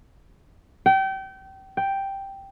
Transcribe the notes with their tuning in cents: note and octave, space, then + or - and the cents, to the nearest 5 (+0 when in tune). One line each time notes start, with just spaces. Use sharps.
G5 -30
G5 +0